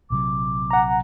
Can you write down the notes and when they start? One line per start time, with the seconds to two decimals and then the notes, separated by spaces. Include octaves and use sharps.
0.10 A#1 C3 F#3 D6
0.71 F#5 A#5